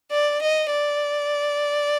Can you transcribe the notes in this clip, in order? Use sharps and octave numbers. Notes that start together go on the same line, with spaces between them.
D5
D#5
D5